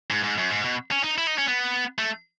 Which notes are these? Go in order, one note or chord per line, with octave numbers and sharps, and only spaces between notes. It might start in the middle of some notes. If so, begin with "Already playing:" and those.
G#2
G#2
F#2
G#2
B2
C#4
D#4
E4
D#4
C#4
B3
A3